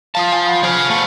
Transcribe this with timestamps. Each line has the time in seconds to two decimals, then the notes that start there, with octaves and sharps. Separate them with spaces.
0.15 F3 F5 A5 D#6
0.32 F5 G#5
0.46 F#5 B5 D#6
0.63 G#4 C5 F5
0.90 A3 B3